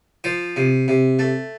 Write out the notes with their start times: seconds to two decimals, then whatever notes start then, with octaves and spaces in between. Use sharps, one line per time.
0.24 F3 C5
0.56 C3
0.88 C3
1.19 A3